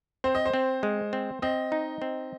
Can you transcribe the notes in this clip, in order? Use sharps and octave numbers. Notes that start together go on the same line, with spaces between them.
C4 C5
D#5
C5
C4
G#3
C4
C4 D#5
D#4
C4